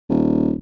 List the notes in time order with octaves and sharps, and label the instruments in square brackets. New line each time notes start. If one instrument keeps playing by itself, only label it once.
[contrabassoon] D#1